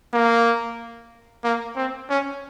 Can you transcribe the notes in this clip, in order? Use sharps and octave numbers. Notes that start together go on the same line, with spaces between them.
A#3
A#3
C4
C#4